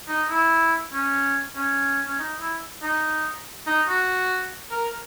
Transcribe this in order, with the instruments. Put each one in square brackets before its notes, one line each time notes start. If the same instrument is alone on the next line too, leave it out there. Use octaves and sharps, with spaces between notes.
[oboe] D#4
E4
C#4
C#4
C#4
D#4
E4
D#4
D#4
F#4
A#4